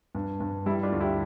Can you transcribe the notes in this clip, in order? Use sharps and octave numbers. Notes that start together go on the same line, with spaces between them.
G2
G2
G3 E4
D4 F4
D2
E4 G4